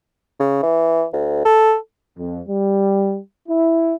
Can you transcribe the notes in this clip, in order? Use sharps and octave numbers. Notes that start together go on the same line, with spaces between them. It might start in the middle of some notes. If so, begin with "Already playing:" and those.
C#3
E3
D2
A4
F2
G3
E4